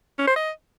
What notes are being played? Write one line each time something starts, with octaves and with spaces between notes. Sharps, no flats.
C#4
C5
D#5